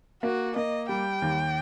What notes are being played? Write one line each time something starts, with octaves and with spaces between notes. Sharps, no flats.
A#3 F#4
A#3 D#5
G3 G5
D#2